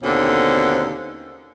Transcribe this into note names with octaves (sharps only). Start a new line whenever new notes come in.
D#2 B2 D3 C4 C#4